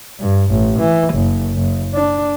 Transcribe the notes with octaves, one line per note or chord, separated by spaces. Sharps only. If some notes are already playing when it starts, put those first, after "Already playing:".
G2
A1
E3
F#1
F#1
D4